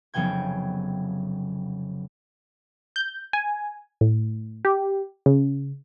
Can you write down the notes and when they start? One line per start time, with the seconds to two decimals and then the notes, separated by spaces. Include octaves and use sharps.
0.14 F1 C#3 F#3 B3 G5 G#6
2.96 G6
3.33 G#5
4.01 A2
4.65 G4
5.26 C#3